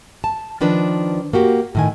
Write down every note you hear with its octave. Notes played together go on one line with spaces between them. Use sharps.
A5
D#3 F3 D4 B4
A#3 F#4 G4
A2 D#3 G#5